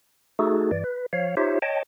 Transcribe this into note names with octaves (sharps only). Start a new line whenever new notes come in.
A3 D#4 F#4 G#4 A4
G2 E3 D5
B4
F3 C#5 F5
D#4 F4 G4 C5 C#5 E5
C#5 D#5 G5 A5